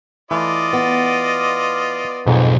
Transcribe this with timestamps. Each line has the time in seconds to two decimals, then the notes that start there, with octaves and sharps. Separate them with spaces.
0.31 E3 A3 F4 D5 D#5
0.73 B3
2.27 B1 F2 G#2